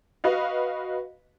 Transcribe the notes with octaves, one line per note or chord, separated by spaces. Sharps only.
F#4 B4 D#5 F5